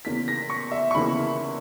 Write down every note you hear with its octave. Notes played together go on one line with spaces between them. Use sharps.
E2 C#3 E3 A#3 B6
A#6
C#6
E5
C#6
E2 C#3 E3 A#3 B5